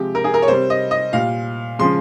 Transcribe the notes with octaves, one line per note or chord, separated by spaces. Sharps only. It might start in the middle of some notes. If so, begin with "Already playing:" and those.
Already playing: C3 F3 G#3 G4
A#4
G#4
A#4
C#5
C3 G3 C5
D#5
D#5
A#2 G3 F5
C#3 F3 G#3 C6